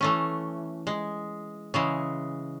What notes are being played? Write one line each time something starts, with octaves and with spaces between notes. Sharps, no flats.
E3 A3 C#4
G#3
C#3 E3 G#3